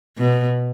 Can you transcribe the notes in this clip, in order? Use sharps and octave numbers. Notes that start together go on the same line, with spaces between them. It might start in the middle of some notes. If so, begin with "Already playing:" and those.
B2